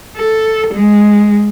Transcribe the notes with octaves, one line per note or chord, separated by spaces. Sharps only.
A4
G#3